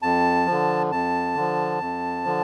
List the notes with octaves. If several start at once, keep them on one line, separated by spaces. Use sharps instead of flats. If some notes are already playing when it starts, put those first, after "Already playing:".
F2 A5
F3
D3
F2 A5
D3 F3
F2
D3 F3